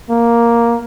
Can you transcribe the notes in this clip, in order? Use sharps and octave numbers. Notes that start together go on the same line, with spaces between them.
A#3